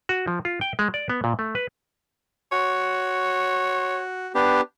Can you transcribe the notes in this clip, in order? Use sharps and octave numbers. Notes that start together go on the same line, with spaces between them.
F#4
F3
F4
G5
G#3
D5
B3
A#2
A3
B4
F#4 C#5
B3 D4 G4